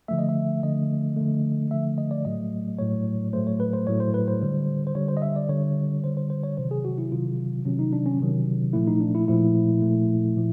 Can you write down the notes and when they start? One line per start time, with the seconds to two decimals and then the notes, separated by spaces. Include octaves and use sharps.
0.08 D3 F3 A3 E5
0.19 D#5
0.29 E5
0.63 D3 F3 A3 D#5
1.16 D3 F3 A3
1.71 D3 F3 A3 E5
1.98 D#5
2.11 D5
2.25 A2 F#3 A3 D#5
2.79 A2 F#3 A3 C#5
3.33 A2 F#3 A3 C5
3.47 C#5
3.60 B4
3.73 C5
3.87 A2 F#3 A3 C#5
4.00 C5
4.14 B4
4.28 C5
4.42 D3 G3
4.87 C5
4.95 D3 G3 C#5
5.08 C5
5.17 D#5
5.22 E5
5.36 D5
5.49 D3 G3 C#5
6.04 D3 G3 C5
6.17 C5
6.30 C5
6.43 C#5
6.57 C3 D#3 F#3 C5
6.71 G#4
6.85 F#4
6.98 E4
7.12 C3 D#3 F#3 F4
7.65 C3 D#3 F#3 C#4
7.79 D#4
7.93 D4
8.06 C#4
8.20 C3 D#3 F#3
8.73 A#2 F3 A3 E4
8.87 D#4
9.01 D4
9.15 E4
9.27 A#2 F3 A3 E4
9.82 A#2 F3 A3
10.36 A#2 F3